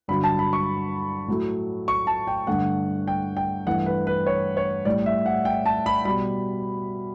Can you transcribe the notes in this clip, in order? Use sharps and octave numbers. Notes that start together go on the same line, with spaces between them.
G2 D3 F#3 B5
A5
B5
C#6
A2 F#3 A3
C#6
A5
G5
G2 D3 A3 F#5
G5
G5
G2 E3 A3 F#5
B4
B4
C#5
C#5
A2 G3 D5
E5
F#5
G5
A5
B5
B2 G3 B5